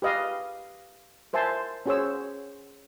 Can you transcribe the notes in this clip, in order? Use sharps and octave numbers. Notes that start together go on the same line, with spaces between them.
G4 B4 D#5 F5
A#4 C5 E5 G#5 A5 C6
C#4 F#4 G#4 C5 C#5 E6